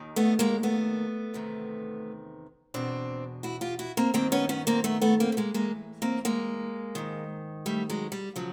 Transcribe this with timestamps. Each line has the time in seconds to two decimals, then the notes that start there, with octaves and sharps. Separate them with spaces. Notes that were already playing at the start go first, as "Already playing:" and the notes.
Already playing: D#2 D#3
0.16 A3 B3
0.39 G#3 A#3
0.63 A3 B3
1.34 E2 C3 D#3
2.74 E2 B2 C4 D4
3.43 E4 F#4
3.61 F4 G4
3.79 E4 F#4
3.97 A#3 C4
4.14 G2 D#3 A#3 C4
4.32 B3 C#4
4.49 B3 C#4
4.67 A#3 C4
4.84 A3 B3
5.02 A3 B3
5.20 A#3 C4
5.32 A3
5.37 G#3 A#3
5.54 A2 E3 G#3 A#3
6.02 A#3 C4
6.25 G#3 A#3
6.95 G#2 D#3
7.66 G3 A3
7.90 F#3 G#3
8.12 G3
8.36 C#3 F3 F#3